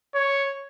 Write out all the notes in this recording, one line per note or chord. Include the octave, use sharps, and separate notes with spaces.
C#5